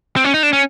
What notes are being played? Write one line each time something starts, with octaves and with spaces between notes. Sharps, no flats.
C4
C#4
D#4
D4
C#4